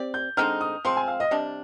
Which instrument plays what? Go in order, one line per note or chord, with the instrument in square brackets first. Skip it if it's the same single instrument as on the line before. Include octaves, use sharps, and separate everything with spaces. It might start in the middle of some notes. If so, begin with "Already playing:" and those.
Already playing: [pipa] C4 G4 D5
[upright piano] G6
[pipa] D3 G#3 C4 D#4 [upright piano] F6
[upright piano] D#6
[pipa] F3 G#3 C4 [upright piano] C6
[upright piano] G#5
F5
D#5
[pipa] C3 G3 D4